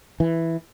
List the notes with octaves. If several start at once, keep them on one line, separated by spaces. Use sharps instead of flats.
E3